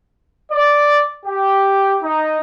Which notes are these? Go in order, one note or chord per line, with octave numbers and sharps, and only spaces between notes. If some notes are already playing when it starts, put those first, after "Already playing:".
D5
G4
D#4